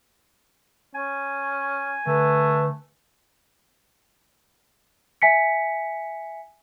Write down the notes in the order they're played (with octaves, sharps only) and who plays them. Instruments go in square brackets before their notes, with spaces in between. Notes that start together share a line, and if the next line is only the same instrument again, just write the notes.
[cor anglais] C#4 [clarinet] G#5
[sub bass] D3 [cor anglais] A3 [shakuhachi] B4
[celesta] E5 G#5 B6 C#7